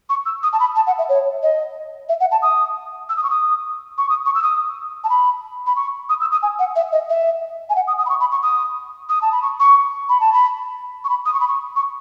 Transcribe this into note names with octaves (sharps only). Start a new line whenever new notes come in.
C#6
E6
D#6
A5
B5
A5
F#5
E5
C#5
D#5
E5
F#5
A5
D#6
E6
D#6
C#6
D#6
C#6
D#6
C#6
E6
D#6
A5
B5
B5
C#6
D#6
E6
D#6
G#5
F#5
E5
D#5
E5
G#5
F#5
D#6
D#6
B5
C#6
B5
C#6
D#6
D#6
A5
B5
C#6
C#6
B5
A5
B5
C#6
B5
D#6
C#6
B5
C#6
C#6